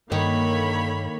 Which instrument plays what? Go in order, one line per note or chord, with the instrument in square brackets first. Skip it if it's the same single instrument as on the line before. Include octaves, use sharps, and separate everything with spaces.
[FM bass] G2 [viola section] D3 C#5 B5 [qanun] D#3 [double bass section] A#3